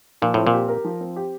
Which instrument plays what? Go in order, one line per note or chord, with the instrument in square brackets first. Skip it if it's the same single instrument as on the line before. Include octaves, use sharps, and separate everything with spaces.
[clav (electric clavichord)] A#2 [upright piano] F3
[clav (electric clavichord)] A2 [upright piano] C4
[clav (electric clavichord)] A#2
[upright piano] G4
A#4
F3
C4
G4